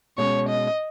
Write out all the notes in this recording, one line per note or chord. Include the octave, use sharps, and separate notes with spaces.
B2 G#3 C#4 C#5
D#5